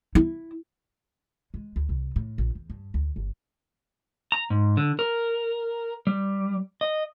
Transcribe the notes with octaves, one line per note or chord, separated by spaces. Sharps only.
E4
G#3
D2
C2
A2
A#1
E2
G2
D2
G1
A#5
G#2
D3
A#4
G3
D#5